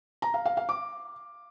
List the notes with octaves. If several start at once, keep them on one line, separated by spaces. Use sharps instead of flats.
A#5
F5
F5
F5
D6